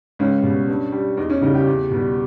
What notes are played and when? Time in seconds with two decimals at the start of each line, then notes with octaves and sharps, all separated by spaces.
0.19 C#2 C#4
0.43 B2 G3
0.68 G2
0.92 G3
1.17 E2 D#4
1.30 C#4
1.41 C#3 E3 G3 D#4
1.54 G4
1.67 E2
1.91 B2 G3